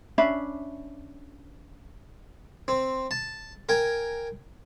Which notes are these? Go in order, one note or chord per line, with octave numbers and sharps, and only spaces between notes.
C#4 D4 E5 B5
C4
A5
A#4 G5 G#5